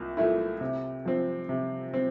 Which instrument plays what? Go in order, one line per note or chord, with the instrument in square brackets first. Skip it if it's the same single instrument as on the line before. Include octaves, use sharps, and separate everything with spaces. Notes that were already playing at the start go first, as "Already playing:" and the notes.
Already playing: [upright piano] C2 A#2
A#2 A3 E4
C3
F3 C4
C3
C4